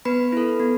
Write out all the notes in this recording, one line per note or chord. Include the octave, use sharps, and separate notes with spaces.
B3 B4 B5
E4 A4
B3